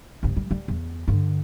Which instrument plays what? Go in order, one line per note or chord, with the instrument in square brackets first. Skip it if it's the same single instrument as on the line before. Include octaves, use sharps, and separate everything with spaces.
[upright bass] G1 C3
G3
G3
E2
G2 D3